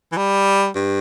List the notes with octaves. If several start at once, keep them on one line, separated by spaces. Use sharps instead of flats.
E3
G3
G2